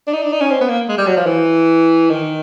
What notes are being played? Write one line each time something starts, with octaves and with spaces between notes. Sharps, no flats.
D4
D#4
D4
D#4
C#4
C4
B3
A#3
G#3
G3
F#3
F3
E3
D#3